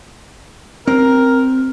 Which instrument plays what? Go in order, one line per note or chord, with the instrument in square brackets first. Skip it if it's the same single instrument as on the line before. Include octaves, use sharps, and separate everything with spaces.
[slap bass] C4 [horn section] G4 A#4